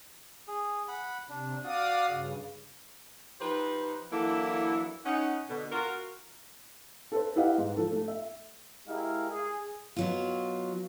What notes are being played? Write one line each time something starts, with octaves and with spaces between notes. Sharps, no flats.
G#4
F#5 B5
C3 D4
F#4 D5 F5 D#6
G2 C#3
F3 D#4 G4 B4 C5
E3 F#3 A#3 D4 E4 A4
C#4 D#4 F#5
B2 D3
F4 F#4 A#4
A4 B4 C5
E4 G4 B4 D#5 F5 F#5
G#2
F3 A4
A3
E5
G#3 E4 G4 A#4 F5
G#4
B2 F#3 F4